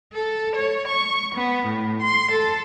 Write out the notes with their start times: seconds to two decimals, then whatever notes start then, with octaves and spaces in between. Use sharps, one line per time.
0.13 A4
0.55 C#5
0.87 C#6
1.34 B3
1.67 A2
2.01 C6
2.31 A4